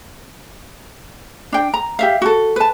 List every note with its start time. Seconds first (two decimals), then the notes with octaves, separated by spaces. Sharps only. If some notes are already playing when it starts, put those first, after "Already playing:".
1.52 D4 G5
1.74 A#5
1.99 G4 E5 F5
2.22 F#4 A4
2.56 B4 A5